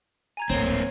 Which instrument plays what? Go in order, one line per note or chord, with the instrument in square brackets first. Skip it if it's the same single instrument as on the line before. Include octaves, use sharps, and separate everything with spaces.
[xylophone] G#5 A#5 G#6
[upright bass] D1 A#1 [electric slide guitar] A#3 C4 [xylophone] C#5